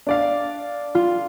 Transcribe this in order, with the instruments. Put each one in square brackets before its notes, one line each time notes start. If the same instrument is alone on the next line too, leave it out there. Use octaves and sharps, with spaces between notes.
[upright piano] D4 D5 F5
[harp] F4